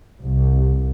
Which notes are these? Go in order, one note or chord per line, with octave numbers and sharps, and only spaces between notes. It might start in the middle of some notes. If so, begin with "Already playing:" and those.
C2